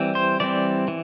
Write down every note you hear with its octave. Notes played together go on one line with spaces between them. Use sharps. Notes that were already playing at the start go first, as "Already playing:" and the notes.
Already playing: E3 G3 C4
C5
E3 G3 C4 D5
E3